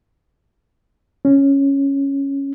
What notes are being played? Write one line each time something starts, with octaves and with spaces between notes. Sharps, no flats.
C#4